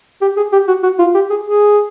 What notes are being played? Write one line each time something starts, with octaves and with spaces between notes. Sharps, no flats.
G4
G#4
G4
F#4
F#4
F4
G4
G#4
G#4